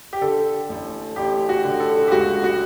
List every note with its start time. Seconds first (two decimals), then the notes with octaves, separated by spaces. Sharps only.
0.13 G4
0.21 D3 A4
0.69 A1
1.16 A1 G4
1.49 F#4
1.64 D3
1.80 A4
2.08 G4
2.12 C#2 F#4
2.44 F#4